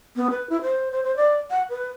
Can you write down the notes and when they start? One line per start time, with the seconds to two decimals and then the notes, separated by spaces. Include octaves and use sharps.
0.16 B3
0.30 B4
0.50 E4
0.62 C5
0.92 C5
1.04 C5
1.17 D5
1.51 F#5
1.70 B4